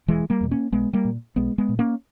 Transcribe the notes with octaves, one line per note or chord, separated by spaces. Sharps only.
E1 E3 G#3
G3 A#3
E2 B2
A#3 C#4
B1 G#3 B3
G3 A#3
A#2
B1 G#3 B3
G#3 B3
A#2
A#3 C#4